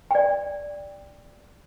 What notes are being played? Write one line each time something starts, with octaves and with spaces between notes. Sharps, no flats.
D5 G5